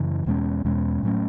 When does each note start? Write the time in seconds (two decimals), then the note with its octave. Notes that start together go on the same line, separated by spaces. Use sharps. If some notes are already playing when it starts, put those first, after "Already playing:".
Already playing: F#2 C#3 E3
0.26 E2 B2 G#3 C#4
0.65 E2 B2 G#3 C#4
1.03 A2 F#3 A3 C#4